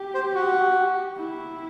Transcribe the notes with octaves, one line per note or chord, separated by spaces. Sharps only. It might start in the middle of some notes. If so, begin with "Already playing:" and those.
Already playing: G4
C5
F#4
E4